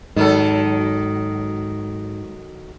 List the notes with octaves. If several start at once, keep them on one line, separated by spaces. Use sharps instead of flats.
G#2 D#3 F#3 A4